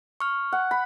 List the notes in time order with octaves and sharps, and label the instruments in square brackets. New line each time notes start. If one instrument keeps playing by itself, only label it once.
[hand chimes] C#6 F6
[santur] F#5
B5